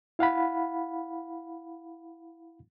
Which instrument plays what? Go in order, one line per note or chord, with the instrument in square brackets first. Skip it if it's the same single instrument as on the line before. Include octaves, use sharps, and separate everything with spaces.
[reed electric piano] E4 F5 F#5 B5